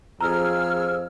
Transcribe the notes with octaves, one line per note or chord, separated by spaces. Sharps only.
F2 G#4 A#5 E6 F6